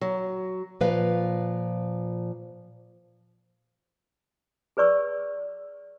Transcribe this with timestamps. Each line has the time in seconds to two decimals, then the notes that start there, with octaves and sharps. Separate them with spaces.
0.01 F#3
0.81 A#2 F3 B4 F5
4.77 G#4 B4 D5 C#6 E6